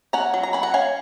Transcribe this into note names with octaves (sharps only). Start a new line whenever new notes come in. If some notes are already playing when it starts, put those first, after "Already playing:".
C#4 F#5 A#5
F#3
A#5
C#4 B5
F#5 A#5
C#4 F5 G#5